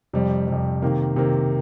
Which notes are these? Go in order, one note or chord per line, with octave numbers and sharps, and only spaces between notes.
F2 C3 G3
F2 C3 G3
C3 D#3 A#3
C3 D#3 A#3